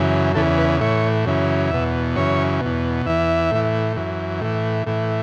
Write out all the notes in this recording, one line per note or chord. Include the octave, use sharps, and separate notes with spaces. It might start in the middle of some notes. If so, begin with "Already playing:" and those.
Already playing: F#2 C#3 E3
E2 C#3 E3 A4
B4
A2 E3 C#5
F#2 C#3 E3
E2 B2 E5
F#2 C#3 E3 C#5
E2 B2
E2 E3 E5
A2 E3
F#2 E3
A2 E3
A2 E3